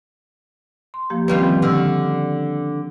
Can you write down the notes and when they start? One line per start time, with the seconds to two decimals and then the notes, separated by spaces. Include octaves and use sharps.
0.94 C6
1.10 F3 A#3 G4
1.28 D#3 E3 G3 C4 C#4 F4
1.43 F3 G4
1.62 D3 C#6 E6 F6